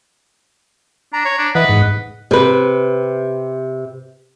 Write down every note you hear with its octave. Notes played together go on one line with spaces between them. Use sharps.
D4 A#5
C#5
D4
E3 B4 D#5 F#5
G#2
C3 B4